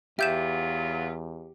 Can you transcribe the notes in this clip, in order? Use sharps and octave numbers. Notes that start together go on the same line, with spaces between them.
E2 F#3 B3 F4 G4 E5 G6 E7